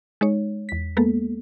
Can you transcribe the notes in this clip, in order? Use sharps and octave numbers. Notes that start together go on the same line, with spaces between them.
G#3 D#4 C#5
E2 B6
G#3 A#3 B3 A4